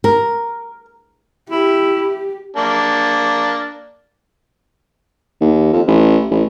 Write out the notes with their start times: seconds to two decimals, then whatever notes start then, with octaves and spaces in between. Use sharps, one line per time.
0.04 A#4
1.50 E4 G4
2.57 A#3 D4
5.41 D#2
5.73 F2
5.87 A1
6.31 A1